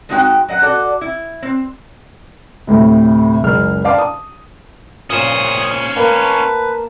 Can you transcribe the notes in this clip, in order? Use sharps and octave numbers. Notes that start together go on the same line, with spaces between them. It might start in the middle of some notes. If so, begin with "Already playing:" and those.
G#3 C4 D#4 F#4 E5 G5
F#3 D#5 F#5
F#4 A4 D5
E4
C4
D2 A2 C3
F#1 C#2 G#4 F6
D5 F5 A5 D6
D#6
A#2 C#3 C#4 C5 D#6
A#3 B4 A5